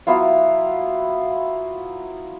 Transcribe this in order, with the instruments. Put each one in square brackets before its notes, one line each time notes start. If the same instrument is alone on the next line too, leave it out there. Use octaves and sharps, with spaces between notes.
[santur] F#3 B3 E4 F4